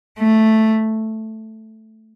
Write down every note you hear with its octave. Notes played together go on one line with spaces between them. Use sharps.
A3